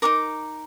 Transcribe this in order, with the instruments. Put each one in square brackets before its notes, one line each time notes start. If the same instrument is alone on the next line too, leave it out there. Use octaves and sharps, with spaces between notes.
[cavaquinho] D#4 F#4 A#4 D6